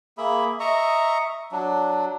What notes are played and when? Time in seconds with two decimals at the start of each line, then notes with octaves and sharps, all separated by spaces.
0.18 A#3 G#4 E5 B5
0.60 D#5 E5 A#5 C#6
1.52 F#3 D4